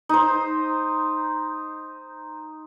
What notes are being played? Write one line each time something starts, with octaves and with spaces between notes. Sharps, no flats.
D#4 C5